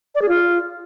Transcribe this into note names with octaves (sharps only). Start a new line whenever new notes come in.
D5
G#4
F4